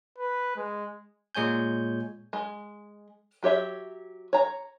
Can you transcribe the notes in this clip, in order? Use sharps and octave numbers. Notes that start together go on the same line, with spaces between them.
B4
G#3
A#2 G#3 C#5 G#5 G6
G#3
F#3 G4 C#5 E5
C#5 A#5